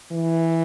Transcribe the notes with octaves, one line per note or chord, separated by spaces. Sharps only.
E3